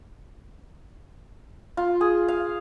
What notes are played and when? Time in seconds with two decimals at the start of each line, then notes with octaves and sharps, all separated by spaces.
1.77 F4
2.01 G#4
2.28 F5